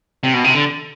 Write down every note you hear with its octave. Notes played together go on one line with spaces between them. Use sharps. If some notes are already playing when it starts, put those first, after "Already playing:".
C3
B2
C3
D3